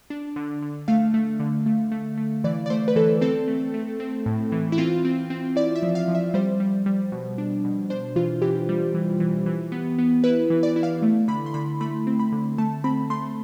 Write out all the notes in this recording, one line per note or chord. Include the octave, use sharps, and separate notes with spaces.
D4
D3
D3
A3 F5
A3
D3
A3
A3
A3
E3 D5
D5
A3 C5
B4
E3 A4
C4 A4
A3
A3
C4
A2
E3
E4
C4 F4
C4
C4
E4 D5
E5
F3
F5
F3
E5
G3 C5
G3
G3
B2
D4
B2
D4 C5
E3 F4
E3 G4
G3
E3
E3
E3
B3
B3
E4 B4
E3
D5
E4
F5
A3
D3 B5
C6
D3 B5
A3 B5
C4
B5
D3
A3 A5
C4 B5
A3 C6